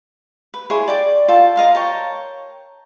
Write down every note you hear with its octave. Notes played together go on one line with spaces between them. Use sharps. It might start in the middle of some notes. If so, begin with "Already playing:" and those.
B4
E4 G#4 C#5 C6
D5 G5 D6
F4 A4 G5 A5
A#4 D#5 F5 C6
A#4 C#5 G5 A5